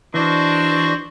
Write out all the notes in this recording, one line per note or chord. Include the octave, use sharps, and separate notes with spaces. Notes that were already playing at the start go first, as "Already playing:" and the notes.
E3 D4 F#4 C5 D#5 C#6